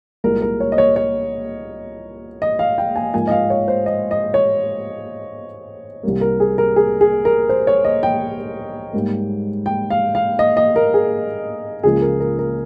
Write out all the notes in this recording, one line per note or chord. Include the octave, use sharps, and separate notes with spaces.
C2 A#2 G#3 A#4
A#4
C#5
D#5
C#5
C#5
D#5
F5
G5
G#5
G#2 F3 A#3 G#5
D#5
F5
C#5
C5
D#5
D#5
C#5
C2 C3 G3 A#3
A#4
G#4
A#4
G#4
G#4
A#4
C5
C#5
D#5
G5
G#2 G3 A#3
G5
F5
F5
D#5
D#5
A#4
G#4
C#2 C#3 F3 A#3 G#4
A#4
A#4
A#4